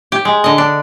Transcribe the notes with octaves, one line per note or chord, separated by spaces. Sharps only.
G4
G#3
D3 D#5
D4